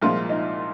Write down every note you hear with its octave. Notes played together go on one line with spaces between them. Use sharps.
C2 A#2 F3 G#3 F4
D#4